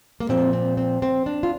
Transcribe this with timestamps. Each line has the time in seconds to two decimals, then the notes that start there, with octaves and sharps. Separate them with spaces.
0.20 A#3
0.29 A#2 F3 C4
0.53 C4
0.77 C4
1.02 C4
1.26 D4
1.43 F4